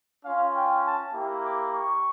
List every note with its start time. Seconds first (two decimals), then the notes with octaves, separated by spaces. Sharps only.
0.25 C#4 F4 F5
0.55 G5
0.84 A5
1.13 A#3 E4 G4
1.43 D6
1.72 C#6